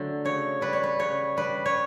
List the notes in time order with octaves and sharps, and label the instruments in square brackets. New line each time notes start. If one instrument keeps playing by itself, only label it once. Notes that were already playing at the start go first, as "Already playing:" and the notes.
Already playing: [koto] D3 F#3 A3
C#3 C#5
G3 B4
C#5
B4
C#3 C#5
G3 B4
C#5